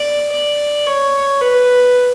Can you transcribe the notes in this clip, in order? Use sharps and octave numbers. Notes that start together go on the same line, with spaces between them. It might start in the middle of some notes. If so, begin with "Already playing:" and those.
Already playing: D5
D5
C#5
B4